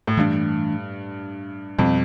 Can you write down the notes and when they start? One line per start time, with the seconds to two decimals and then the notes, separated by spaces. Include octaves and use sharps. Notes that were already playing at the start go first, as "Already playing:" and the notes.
0.07 A2
0.17 G2 E3 A3 D4
1.79 F2 B2 G3 C4